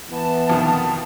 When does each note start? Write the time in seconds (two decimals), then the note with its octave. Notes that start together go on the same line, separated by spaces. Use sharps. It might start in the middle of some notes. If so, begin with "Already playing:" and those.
0.11 E3 B3 A5
0.50 F2 B2 D#3